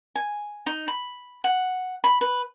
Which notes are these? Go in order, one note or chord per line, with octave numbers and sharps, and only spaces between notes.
G#5
D#4
B5
F#5
B5
B4